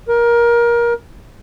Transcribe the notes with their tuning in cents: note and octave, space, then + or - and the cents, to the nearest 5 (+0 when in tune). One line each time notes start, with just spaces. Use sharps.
A#4 +20